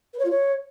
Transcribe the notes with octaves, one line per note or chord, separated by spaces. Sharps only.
B4
C#5
F4
C#5